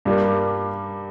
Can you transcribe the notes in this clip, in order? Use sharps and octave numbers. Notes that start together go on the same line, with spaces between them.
G2 G3 A#3